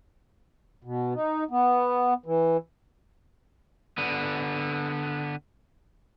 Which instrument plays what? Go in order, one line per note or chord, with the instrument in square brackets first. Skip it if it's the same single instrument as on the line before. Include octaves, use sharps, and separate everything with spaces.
[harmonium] B2
D#4
B3
E3
[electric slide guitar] D3 B3